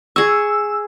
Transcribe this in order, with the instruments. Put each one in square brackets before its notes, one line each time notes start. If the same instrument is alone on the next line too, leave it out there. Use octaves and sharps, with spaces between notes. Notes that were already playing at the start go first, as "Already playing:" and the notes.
[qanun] G#4 C#6 [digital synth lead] E6